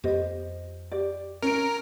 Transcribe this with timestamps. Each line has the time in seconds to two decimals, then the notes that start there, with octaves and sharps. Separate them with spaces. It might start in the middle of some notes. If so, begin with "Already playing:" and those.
0.04 F2 B3 G4 C5 D#5
0.92 G4 D5
1.43 C#4 A#4 D7